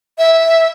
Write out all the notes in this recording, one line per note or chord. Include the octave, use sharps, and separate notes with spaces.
E5